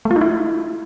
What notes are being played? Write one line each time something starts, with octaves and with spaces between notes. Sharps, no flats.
A3
F4
D#4
E4